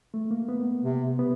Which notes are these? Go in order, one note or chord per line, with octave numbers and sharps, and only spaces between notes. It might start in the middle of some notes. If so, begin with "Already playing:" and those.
A3
A#3
B3
C3
B3